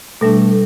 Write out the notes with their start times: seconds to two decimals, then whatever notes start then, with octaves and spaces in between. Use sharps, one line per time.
0.21 B2 G3 A3 D4